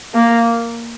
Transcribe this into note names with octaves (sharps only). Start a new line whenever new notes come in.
A#3